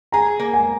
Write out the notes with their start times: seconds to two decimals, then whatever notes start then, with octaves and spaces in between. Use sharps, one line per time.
0.12 G#4 A#5
0.39 A#3
0.53 G#5